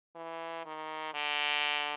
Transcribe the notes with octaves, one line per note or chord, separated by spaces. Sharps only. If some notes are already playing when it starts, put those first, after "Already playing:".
E3
D#3
D3